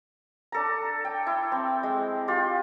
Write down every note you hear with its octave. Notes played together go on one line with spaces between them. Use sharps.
D4 A4 A#5
G5
E4
C4
G#3
F4 G4